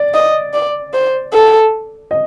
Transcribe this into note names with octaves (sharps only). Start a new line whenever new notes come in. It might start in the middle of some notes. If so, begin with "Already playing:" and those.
Already playing: D5
D#5
D5
C5
A4
D#5